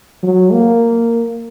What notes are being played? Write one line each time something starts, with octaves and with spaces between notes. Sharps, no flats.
F#3
A#3